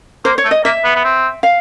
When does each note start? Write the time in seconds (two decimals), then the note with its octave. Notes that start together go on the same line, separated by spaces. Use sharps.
0.25 A#3 C5
0.38 C#5
0.45 A3
0.51 D#5
0.64 A#3 E5
0.85 B3
0.95 B3
1.04 C4
1.43 F5